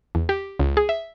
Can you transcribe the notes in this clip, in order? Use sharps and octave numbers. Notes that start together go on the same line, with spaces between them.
E2
G4
C#2
G#4
E5